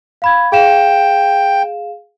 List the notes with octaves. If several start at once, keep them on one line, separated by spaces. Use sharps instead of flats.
F5 B5 G#6
G#4 F5 G5 E7